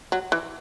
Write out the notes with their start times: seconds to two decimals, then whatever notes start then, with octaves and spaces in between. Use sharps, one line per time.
0.12 F#3
0.32 E3